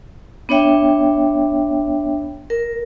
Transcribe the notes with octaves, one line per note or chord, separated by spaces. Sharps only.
B3 D4 C#5 E5 G5
A#4